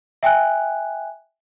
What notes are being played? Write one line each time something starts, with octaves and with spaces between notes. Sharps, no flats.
E5 G5 G#5 F#6